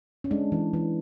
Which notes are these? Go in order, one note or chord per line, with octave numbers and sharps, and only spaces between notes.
C#4
G#3 D4
E3
E3